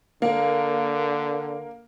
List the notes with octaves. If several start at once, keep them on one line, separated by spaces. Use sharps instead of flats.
D3 A#3